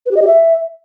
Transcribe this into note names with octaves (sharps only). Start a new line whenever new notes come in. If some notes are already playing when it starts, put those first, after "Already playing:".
B4
G4
D#5
G4
E5